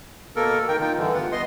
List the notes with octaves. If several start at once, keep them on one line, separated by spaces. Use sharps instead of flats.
B2 A#3 A4 A#4
D#3 A#4 G5
D#4 F4 G5
G2 D3 E3
B3 F4 F#5
B3 D#5 C6